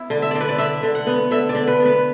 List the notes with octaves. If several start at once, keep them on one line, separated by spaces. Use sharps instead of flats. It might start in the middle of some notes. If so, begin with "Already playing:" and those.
Already playing: B3 E4
D3
E5
D3 D5
B4
D5
D3 E5
D3
F#5
B3
D3 E5
D5
D3
B4
B3
B4